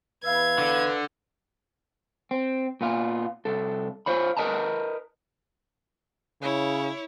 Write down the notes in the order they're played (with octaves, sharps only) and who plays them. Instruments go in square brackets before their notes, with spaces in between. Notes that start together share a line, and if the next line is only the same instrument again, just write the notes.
[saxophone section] E2 E5 F5 [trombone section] B4 [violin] G#6
[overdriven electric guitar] D3
[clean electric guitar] C4
A#2 B3 F4
C2 A4
F4 C5 C#5 B5
A#4 B4 D#5 A5 A#5
[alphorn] C#3 [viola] E4 C#5